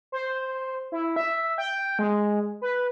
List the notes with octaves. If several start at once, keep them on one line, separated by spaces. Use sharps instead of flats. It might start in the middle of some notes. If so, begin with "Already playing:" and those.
C5
E4
E5
G5
G#3
B4